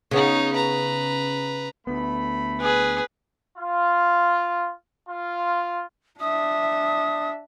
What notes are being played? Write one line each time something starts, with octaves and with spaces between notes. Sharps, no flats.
C#3 B3 D#4 C#5
B4 A#5
D2 A3 B3 B5
G#4 B4
F4
F4
D4 E5 D#6